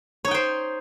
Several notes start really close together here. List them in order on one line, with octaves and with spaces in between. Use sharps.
C#5 D#4 G5 C5